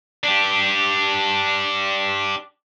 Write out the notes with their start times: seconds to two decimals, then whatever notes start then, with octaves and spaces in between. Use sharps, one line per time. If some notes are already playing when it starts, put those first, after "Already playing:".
0.24 D4 G4